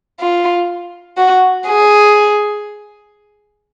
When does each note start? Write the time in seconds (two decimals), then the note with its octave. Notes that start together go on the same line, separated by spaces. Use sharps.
0.20 F4
1.17 F#4
1.68 G#4